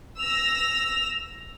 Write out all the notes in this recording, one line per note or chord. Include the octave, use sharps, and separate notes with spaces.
E6 A#6 F7